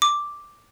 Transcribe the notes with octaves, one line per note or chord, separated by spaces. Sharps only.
D6